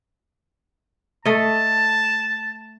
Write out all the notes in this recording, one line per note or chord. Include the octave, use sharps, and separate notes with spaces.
A3 D#5 A5